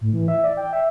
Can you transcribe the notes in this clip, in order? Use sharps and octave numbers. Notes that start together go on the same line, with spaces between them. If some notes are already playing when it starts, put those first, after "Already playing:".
A2
E3
E5
D5
G5
E5